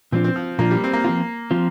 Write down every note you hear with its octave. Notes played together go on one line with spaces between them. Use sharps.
A#2 F3 C4 D4 F4
C4
F3
A#2 F3 A#3 D4 F4
G3
C4
A#3
F3 C4 F4
F3 C4 F4